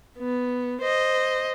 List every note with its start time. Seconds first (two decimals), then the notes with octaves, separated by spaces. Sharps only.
0.19 B3
0.81 C5 D#5